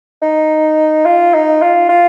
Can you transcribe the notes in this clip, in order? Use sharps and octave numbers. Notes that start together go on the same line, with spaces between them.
D#4
F4
D#4
F4
F4